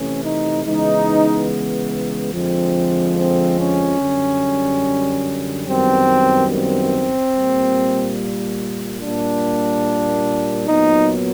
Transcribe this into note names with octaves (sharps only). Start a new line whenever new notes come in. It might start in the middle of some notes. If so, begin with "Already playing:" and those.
Already playing: C3 E3 A3 C#4
D#4
C#3 E3 G#3 B3 D#4
F2 D3 F3 G#3 C4
C4
C#4
F#2 D3 G3
F#2 D#3 G3 B3 C4
C4
A#2 G3 A#3
A#2 G3 A#3 D4
A#2 F#3 B3 D#4